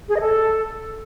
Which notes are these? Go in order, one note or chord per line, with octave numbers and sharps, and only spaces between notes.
G#4
D#5
A4